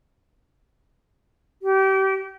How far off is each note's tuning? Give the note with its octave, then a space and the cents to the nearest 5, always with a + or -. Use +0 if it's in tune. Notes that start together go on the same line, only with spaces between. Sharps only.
G4 -30